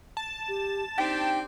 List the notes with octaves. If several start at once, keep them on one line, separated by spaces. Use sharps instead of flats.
A5
G4
C4 D4 D#4 G4 G5